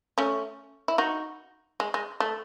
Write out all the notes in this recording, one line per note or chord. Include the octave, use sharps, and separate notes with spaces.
A3 C#4
E4
D#4 F#4
G#3
G#3
A3